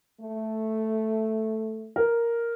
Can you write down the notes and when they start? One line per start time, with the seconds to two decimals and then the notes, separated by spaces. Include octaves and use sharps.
0.21 A3
1.96 A#4